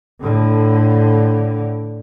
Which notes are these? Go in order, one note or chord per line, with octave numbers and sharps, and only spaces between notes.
A2 D3